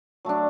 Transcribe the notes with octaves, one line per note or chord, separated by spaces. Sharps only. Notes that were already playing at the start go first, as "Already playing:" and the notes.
F#3 A3 D4